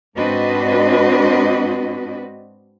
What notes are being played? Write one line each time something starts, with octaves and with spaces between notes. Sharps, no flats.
G#2 C4 D4 F#4 B4 D#5